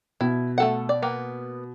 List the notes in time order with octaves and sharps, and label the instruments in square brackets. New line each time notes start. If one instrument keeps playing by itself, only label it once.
[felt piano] B2 [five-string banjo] E4
[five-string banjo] A3 A4 F#5
D5
A#3 B3